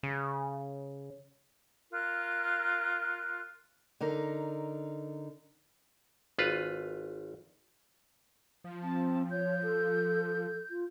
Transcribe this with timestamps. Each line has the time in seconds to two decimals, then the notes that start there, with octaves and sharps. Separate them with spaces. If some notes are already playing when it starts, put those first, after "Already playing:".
0.03 C#3
1.91 F4 A#4 F#6
4.01 D3 D#4 A#4
6.38 G#1 F4 B4
8.64 F3
8.82 C4 A5
9.31 C#5 G6
9.63 A4
10.70 F4